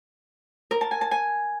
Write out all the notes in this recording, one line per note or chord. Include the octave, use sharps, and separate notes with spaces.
A#4
A5
G#5
A5
G#5